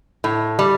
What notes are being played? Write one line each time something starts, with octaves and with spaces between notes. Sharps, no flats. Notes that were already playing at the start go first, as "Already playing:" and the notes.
A2
G3